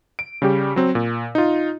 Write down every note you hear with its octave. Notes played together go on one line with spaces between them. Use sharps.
D7
C#3 G3 G4
F#3 C4
A#2
D#4 F4